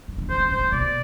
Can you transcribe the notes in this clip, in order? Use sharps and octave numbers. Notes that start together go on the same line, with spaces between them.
D#3
D3
D3 C5
C#3
G#2 C5
G2
B2 D5